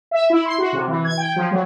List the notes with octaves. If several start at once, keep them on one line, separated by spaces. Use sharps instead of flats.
E5
E4
C6
F#4
C3
E3
G#6
G5
F3
F#3